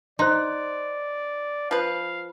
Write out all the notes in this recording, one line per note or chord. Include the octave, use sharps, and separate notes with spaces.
D#4 C5 D5 C6
F3 B4 F5